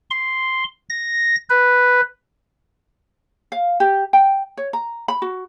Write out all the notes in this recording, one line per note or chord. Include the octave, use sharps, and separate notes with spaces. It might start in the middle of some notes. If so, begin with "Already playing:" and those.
C6
A#6
B4
F5
G4
G5
C#5
A#5
B5
F#4